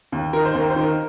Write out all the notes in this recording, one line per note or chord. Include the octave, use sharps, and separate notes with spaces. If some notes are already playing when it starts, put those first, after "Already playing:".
D#2
D#3 A#4
C5
D#2 A#4
C5
D#3 A#4